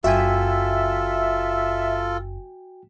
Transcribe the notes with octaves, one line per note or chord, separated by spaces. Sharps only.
F#1 F#2 F4 F#4 A4 E5 G5 G#5